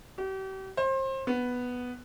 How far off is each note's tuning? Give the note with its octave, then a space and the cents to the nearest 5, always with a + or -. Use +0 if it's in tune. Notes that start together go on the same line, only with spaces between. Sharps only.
G4 -40
C5 +30
B3 +0